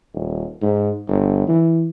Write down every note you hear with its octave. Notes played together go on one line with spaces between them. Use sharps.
D#1
G#2
G1
E3